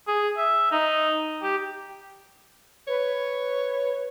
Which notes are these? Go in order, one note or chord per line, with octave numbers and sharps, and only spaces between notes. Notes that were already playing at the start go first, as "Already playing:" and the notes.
G#4
E5
D#4
G4
B4 C#5